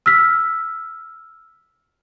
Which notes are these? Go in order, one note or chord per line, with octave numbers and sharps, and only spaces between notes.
E6 F6 B6